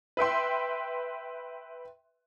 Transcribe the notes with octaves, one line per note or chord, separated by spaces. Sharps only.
B4 E5 G5 C6